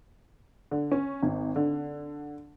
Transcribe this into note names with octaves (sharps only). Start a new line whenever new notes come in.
D3
C#4
G#1
D3